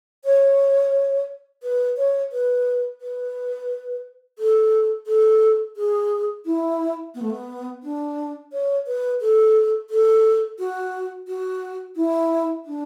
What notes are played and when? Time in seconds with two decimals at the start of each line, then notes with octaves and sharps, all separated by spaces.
0.25 C#5
1.63 B4
1.97 C#5
2.32 B4
3.01 B4
4.39 A4
5.07 A4
5.77 G#4
6.46 E4
7.15 B3
7.22 A3
7.30 B3
7.83 D4
8.52 C#5
8.87 B4
9.21 A4
9.90 A4
10.59 F#4
11.27 F#4
11.96 E4
12.65 D4